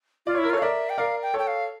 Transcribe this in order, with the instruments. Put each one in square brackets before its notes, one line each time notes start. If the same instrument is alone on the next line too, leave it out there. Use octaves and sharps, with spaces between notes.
[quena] F4 [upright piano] D5
[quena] E4 [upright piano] C#5
[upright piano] A#4
[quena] F4 [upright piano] A4 C#5
[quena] F5
[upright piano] A#4 D5 [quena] E5
[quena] G5
[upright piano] A#4 D5 [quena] F5
[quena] G5
[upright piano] A4 C#5 [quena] G5
[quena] F5